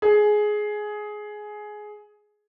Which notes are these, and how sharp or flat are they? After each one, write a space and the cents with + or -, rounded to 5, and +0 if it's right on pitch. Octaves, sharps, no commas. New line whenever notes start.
G#4 +15